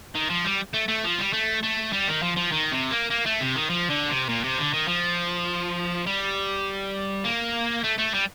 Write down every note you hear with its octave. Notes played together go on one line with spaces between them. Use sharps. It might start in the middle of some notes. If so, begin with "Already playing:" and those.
D#3
F3
G3
A3
A3
F3
G3
A3
A3
G3
D#3
F3
F3
D#3
C3
A#3
A#3
A3
C3
D#3
F3
D3
C3
A#2
C3
D3
D#3
F3
G3
A#3
A3
A3
G3